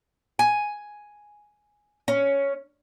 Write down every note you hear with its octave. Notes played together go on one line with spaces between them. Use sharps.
G#5
C#4